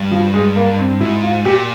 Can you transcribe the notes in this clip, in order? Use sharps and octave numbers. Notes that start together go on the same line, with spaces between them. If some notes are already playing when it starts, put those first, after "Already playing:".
Already playing: G2
F3
G#3
A#3
C4
G#2 E4
F4
A#2 G4